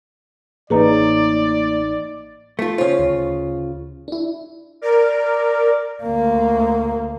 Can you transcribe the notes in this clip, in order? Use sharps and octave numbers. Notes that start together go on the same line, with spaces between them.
A1 A#3 D#4 G#4 B4 C#5 D5 A#5
A3 F4
C#3 F4 C5 C#5
D2
D4 E4
A#4 D5
D2 A#3